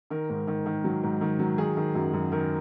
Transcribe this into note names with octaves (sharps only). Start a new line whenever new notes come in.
D#3 A#4
G#2
D#3
D#3
F#3
G#2
D#3
F#3
D#3 G#4
D#3
F#2
F#2
D#3 A#4